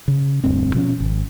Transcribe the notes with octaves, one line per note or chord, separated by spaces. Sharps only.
C#3
E1 D2 G2 C4
B2 F3 C4 C#4
G#1